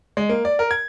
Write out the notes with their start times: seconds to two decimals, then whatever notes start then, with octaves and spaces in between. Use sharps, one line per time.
0.17 G#3
0.29 A#3
0.45 D5
0.59 A#4
0.71 G#6